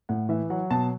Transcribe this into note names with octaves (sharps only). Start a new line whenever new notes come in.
A2 F#5
E3 E5
F#3 F#5
B2 A5